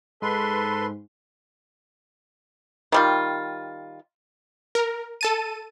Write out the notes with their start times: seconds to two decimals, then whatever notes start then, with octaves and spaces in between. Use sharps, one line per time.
0.22 G#2 A4 B4 C6
2.92 D#3 G3 F4
4.75 A#4
5.21 A4 A5 D#7